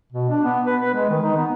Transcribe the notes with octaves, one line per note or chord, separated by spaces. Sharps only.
B2
D4
B3
B4
B4
G#3
D#3
D#4
B3